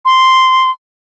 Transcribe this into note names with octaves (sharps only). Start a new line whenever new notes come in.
C6